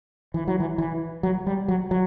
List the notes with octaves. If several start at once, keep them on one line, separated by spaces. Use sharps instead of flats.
E3
F#3
E3
E3
F#3
G3
F#3
F#3